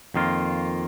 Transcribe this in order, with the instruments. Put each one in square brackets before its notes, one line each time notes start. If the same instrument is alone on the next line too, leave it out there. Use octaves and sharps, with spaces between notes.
[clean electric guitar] F2 D#3 A#3 F4